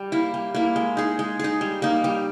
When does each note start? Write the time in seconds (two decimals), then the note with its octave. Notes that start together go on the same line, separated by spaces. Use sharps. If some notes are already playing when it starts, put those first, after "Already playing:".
Already playing: G3
0.12 A#3 E4
0.34 G3
0.55 A#3 E4
0.76 G#3
0.97 D#4 G#4
1.19 G#3
1.39 D#4 G#4
1.61 G3
1.82 A#3 D#4
2.04 G3